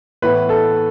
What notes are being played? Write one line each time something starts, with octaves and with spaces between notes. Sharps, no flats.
A2 E3 B3 B4
A4